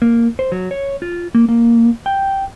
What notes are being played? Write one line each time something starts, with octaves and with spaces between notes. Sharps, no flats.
A#3
C5
F#3
C#5
F4
A#3
A#3
G5